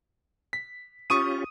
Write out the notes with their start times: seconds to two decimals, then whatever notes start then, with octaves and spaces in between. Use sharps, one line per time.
0.53 B6
1.10 C#4 F4 G4 C#6 D#6 D#7